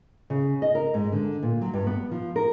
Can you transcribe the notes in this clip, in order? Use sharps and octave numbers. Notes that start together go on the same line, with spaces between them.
C#3
D#5
A#4
G#2
D3
A#2
F#3
G2
B3
F3
A#4